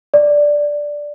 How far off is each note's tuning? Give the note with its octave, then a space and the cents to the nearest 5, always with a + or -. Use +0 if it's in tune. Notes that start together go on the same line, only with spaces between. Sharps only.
D5 +0